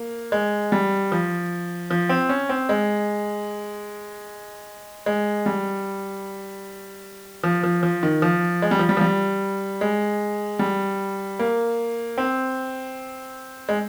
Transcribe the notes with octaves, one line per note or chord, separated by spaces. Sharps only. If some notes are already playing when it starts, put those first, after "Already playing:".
Already playing: A#3
G#3
G3
F3
F3
C4
C#4
C4
G#3
G#3
G3
F3
F3
F3
D#3
F3
G#3
G3
F3
G3
F3
G3
G#3
G3
A#3
C4
G#3